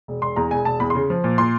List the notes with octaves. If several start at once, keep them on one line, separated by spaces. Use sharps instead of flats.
E1
E1 C6
E2 A#5
E1 G#5
E1 A5
E2 B5
C6
C#3
F3
A#2
A#2 C6